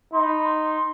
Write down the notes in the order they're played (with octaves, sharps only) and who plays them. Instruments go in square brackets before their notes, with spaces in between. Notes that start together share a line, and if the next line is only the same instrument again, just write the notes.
[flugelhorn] D#4 [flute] C6
[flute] B5
B5
C6